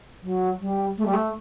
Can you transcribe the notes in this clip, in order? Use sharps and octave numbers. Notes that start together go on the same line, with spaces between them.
F#3
G3
A3
G3
A3